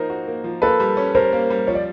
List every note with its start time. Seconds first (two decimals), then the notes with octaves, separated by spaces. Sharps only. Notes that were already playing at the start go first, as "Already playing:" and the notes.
Already playing: F3 A#3 D#4 A#4 C5
0.10 F#4
0.27 A#3
0.44 F3
0.62 A#3 A4 B4
0.80 G3
0.97 C#4
1.15 G3 A#4 C5
1.33 A#3
1.50 G3
1.67 F3 C#5
1.75 D5